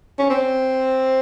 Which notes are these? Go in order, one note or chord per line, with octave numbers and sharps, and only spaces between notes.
C#4
C4